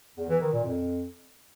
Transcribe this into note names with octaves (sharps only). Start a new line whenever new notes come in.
E2
E3
D#3
A#2
F2